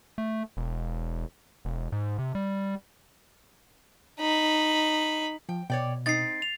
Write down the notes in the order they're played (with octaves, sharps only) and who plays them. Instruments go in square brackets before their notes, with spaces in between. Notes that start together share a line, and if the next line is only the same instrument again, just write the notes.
[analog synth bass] A3
E1
E1
G#2
C3
G3
[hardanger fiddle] D#4 B5
[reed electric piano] F3 [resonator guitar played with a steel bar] G5
[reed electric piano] B2 [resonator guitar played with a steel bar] C#5 D5 G5
[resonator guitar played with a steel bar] C4 D#4 [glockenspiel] A6 C7
[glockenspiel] F7